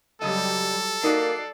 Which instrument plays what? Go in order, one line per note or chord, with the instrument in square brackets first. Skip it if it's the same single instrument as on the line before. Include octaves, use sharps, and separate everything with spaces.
[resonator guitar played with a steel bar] C#3 D#5 [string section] F#3 G3 [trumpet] A4
[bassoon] A#3 [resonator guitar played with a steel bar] D#4 F#4 [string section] D5 C7